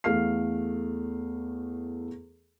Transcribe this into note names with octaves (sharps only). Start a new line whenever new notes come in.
E2 A3 A4 F5 F6 C7